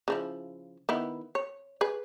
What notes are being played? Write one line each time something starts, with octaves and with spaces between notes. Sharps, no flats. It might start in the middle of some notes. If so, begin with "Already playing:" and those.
C#3 F3 E4
D#3 B3 E4
C#5
G#4 B4